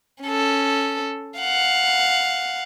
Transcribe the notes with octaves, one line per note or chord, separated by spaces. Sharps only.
C#4 A4
F5 F#5